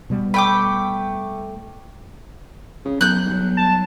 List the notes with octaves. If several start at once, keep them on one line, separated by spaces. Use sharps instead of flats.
B2 G3 B3
A3 G5 B5 D6
C#3
B1 F#3 F#6 G6
B1 F#3 G3
A5